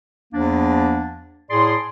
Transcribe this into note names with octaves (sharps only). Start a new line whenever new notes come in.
E2 F3 A#3 D4
A2 G#4 D5 C6